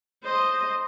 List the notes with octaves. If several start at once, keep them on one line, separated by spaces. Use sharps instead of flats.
C5 D#5